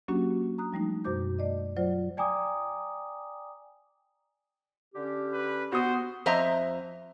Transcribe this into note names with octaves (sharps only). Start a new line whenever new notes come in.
F#3 A#3 C#4 D4 F#4 G4
A#5 D#6 F#6
F3 G3 A3 D#4
F#2 B2 F#4 C5 D6 G6
A3 D5 D#5
F#3 F4 C5 D5
D5 G5 G#5 A#5 D6 D#6
D3 C#4 G4
B4
B3 F#4 C5 D#6
F2 C5 D#5 E5 A#5